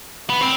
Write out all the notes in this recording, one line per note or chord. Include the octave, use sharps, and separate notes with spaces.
B3
C4